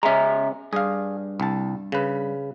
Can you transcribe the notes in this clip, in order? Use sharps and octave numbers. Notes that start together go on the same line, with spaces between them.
C#3 G#3 C#4 E5 A#5
G2 G#4 F5
C2 A5
C#3 B4